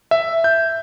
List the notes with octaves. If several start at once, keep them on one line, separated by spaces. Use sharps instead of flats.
E5
G6